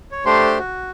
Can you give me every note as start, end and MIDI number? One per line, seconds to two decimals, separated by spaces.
0.11 0.24 73
0.26 0.58 57
0.26 0.58 62
0.26 0.58 67
0.26 0.58 72
0.26 0.58 84
0.59 0.91 66